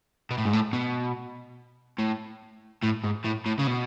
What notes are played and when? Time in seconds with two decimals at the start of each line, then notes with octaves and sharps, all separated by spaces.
0.31 B2
0.38 A2
0.45 G#2
0.53 A2
0.73 B2
1.99 A2
2.83 A2
3.04 G#2
3.25 A2
3.46 A2
3.59 C#3
3.67 B2